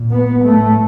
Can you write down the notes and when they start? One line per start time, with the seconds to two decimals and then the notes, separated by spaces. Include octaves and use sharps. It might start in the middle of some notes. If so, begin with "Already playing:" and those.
Already playing: A#2
0.11 B3
0.44 A2 A3